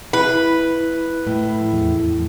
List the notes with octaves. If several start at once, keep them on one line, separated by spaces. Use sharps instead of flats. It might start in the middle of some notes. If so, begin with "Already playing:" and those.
E4 B4
A2
E2